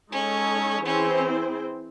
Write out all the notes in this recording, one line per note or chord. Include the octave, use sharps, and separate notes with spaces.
G#3 C#4 D#4 A4 C#5
E3 C4 C#4 E4 G#4 C5